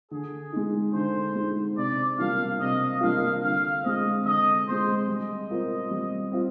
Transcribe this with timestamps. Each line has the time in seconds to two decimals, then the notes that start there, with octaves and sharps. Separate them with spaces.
0.11 D3 G#4
0.53 G#3 D#4
0.94 D3 C5
1.35 G#3
1.40 D#4
1.77 C3 D5
2.19 G3 A#3 D4 F4 F5
2.59 C3 D#5
3.01 G3 A#3 D4 F4 F5
3.43 D3 F5
3.83 G#3 C4 D#5
4.25 D3 D#5
4.67 G#3 C4 C5
5.08 G3 D#5
5.50 C4 F4 A#4
5.91 G3
6.32 C4 F4